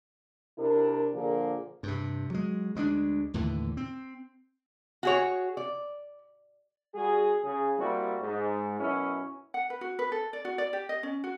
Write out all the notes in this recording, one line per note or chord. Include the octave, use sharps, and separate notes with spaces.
C3 D4 E4 A#4
A#2 D3 F3 A#3 G#4
G2 C3
F#3 G#3
D2 G#3 A3 D4
D#2 A2 D3 E3
C4
F#4 G#4 C#5
D5
G3 F#4 G#4
C#3 G#4
G3 A#3 C4 E4 F#4
G#2
F#2 B2 C#4 E4
F#5
B4
F#4
B4
A4
D5
F#4
D5
G4
D#5
C#4
F#4